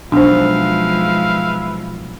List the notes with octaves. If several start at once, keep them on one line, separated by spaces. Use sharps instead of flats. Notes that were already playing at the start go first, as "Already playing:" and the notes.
B1 F3 G#3 D4 B4 C5 E5 F5